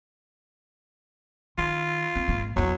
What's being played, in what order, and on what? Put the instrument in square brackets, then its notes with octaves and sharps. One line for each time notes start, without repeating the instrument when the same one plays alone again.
[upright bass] D#3 [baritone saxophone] F4
[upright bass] C4
G#1 A#3
[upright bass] E2 E4 [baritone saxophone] F#3